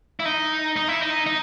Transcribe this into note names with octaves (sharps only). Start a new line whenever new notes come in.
E4
D#4
D#4
E4
D#4
D#4